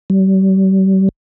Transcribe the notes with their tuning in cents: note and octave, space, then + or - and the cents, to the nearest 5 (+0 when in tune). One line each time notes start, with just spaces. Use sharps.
G3 -40